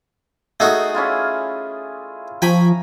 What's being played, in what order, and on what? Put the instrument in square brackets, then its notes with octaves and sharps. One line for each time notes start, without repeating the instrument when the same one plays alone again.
[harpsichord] A3 D#4 F#4 [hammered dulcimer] G#4
[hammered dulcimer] C#4 E4 F4
[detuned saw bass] F3 [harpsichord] G5 G#5 B5 [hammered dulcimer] A#5 C#6